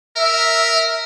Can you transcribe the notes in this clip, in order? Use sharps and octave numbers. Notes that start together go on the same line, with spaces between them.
A#4 E5